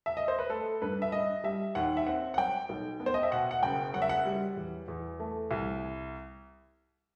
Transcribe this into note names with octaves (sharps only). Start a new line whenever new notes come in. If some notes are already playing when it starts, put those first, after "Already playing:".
E5
D#5
C5
B4
A3 A4
G2 B4
E5
G2 D#5
G3 E5
D#2 F#5
E5
C4 F#5
F#5
F#3 G5
B1
B3
C5
D#5
E5
B2 F#5
F#5
F#1 G5
F#3 F#5
E5
F#5
G3
E2
E2
A3
C2